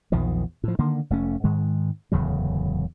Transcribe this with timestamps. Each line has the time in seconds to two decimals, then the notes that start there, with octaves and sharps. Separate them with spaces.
0.12 A#1 E2 D#3 F3
0.64 A2 F3
0.79 D3 D#3 A#3
1.10 F1 A3 C#4
1.44 G#2 D#3 G#3
2.12 D1 E2 C#3 F#3